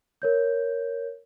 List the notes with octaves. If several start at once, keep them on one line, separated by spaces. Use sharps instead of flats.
A#4 C#5 G6